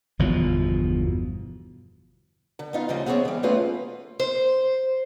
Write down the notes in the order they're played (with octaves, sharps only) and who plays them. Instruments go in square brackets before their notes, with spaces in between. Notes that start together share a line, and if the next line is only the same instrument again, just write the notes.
[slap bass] G1 E2 B2 F3
[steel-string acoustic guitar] D3
B3 D#4 F4
D2 C#3 F3 G3 D#5
B3 C4 G#4 A4 C#5 E5
E3 G3
A3 B3 C#4 F4 G#4 B4
C5